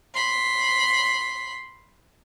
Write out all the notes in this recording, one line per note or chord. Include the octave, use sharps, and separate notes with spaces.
B5 C6